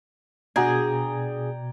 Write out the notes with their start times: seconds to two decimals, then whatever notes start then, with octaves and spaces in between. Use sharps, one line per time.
0.56 B2 D4 F#4 G#4 D5 G5 A#5 G#6